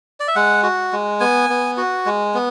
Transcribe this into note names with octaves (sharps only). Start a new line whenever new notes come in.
D5
E5
G#3 F#5
F#4
G#3
B3 G#5
B3
F#4
G#3
B3